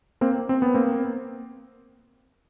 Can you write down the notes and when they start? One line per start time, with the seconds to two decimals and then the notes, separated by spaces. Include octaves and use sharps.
0.21 A#3 C4
0.49 C4
0.62 B3
0.74 A#3 C4